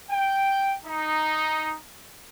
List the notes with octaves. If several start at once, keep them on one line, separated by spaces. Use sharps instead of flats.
G5
D#4